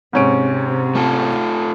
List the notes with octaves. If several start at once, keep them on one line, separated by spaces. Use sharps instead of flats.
G#2 C3 C#4 D7
A3 F4 A4